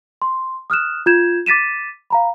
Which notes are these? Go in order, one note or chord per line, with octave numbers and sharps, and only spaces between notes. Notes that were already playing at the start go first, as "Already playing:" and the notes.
C6
D#6 F6 F#6 E7
F4 G6 G#6 E7
D6 A6 B6 D#7 E7
F5 A#5 B5